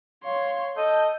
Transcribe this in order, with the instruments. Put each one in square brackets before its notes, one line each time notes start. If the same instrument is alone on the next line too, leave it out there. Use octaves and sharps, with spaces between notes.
[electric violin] C#5 C6 [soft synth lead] F5
[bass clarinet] A4 [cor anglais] D#5 [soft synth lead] A5 [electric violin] G6